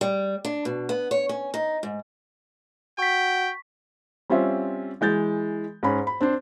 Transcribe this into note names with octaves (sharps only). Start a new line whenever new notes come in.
G3
D4
B2
B3
C#5
C#4
D#4
G#2
F#4 G5 C#6 B6
G3 C4 C#4 F4 E5
E3 G#3 G6 A6
G#2 C#4 B5
B5
C4 D4 C5